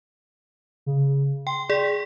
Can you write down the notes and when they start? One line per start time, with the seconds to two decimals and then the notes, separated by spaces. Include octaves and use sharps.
0.86 C#3
1.47 G5 C6
1.70 G#4 D5 B6